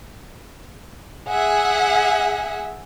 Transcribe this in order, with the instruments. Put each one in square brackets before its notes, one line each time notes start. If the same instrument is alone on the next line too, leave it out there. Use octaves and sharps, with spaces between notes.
[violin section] G#4 E5 F#5